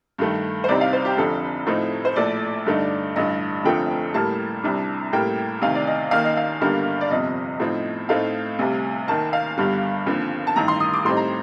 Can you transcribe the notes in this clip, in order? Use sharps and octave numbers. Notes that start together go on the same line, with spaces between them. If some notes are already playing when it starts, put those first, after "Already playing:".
G2 D#3 A3
C5
C2 C3 G3 C4 D#4 D5
F5
C5
G4
F1 F2 D3 A4
A2 F3 A3 C4 D#4
C5
A#1 A2 A3 D5
G2 D3 A3 D#4
A1 G2 D3 D#5
F1 F2 D3 F3 A3 G5
A2 G3 A#3 A5
C2 C3 G3 D4
A2 G3 A#3 G5
D2 C3 D#3 F5
D5
D#5
D#2 D#3 A#3 F5
D#5
F5
G1 G2 D3 G3 A#3
D5
G1 F2 C3 D#5
A2 F3 C4 D#4
A2 A3 C4 D#4 F5
D2 C3 G3
D#2 D#3 A#3 A5
F5
G1 G2 D3 G3
D#2 D3 F3 C4
A5
A1 G2 D#3 A#5
C6
D#6
D6
A2 G3 C4 D#4 C6
A#5